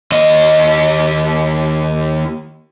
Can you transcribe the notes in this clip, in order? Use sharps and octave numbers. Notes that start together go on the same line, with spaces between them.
D#2 D#5